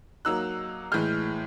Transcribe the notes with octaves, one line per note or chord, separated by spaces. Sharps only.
F#3 A#3 D#4 E6 F#6
A2 E3 G#3 F6 G6